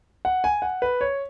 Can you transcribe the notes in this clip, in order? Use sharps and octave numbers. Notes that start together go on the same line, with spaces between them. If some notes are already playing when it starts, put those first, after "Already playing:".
F#5
G#5
F#5
B4
C#5